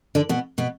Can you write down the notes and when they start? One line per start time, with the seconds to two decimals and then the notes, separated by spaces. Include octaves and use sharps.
0.15 D3 D4
0.29 B2 B3
0.58 B2 B3